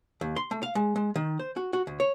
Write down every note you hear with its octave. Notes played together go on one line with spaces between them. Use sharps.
D#2
C6
A3
F5
G#3
G#3
D#3
C5
F#4
F#4
D2
C#5